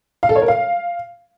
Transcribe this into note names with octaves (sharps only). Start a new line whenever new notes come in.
F5
A4
C#5
A#4
F5